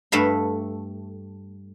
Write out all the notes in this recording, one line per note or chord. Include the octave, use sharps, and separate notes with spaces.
G2 A3 A4 E5 F5 B5